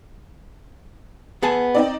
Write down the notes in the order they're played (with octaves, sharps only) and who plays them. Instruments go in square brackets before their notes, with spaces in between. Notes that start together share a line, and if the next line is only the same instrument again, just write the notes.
[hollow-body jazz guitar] B3 G#4 A5
[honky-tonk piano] C4 D#4 D5